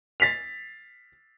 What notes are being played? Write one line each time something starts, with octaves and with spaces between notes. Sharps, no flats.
A6 B6 C7 F7